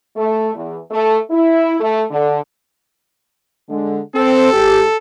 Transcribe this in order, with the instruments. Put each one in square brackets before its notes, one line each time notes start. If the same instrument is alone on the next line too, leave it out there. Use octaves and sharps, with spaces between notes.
[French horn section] A3
E2
A3
E4
A3
D3
D3 G#3
[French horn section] C4 [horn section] A4
[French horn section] G#2 G4